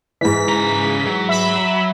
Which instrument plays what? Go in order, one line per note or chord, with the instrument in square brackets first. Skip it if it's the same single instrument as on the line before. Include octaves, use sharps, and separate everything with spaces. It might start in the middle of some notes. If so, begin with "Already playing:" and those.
[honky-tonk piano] G#2 E3 [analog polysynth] B6
[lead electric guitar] C#3 A#5
F#3
[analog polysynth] E5 B5